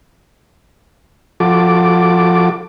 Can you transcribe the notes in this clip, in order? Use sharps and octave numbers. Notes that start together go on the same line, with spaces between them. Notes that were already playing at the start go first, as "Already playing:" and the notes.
F3 F#4 A4 D6